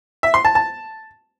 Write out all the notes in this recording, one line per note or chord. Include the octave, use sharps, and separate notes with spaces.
E5
C6
A5
A5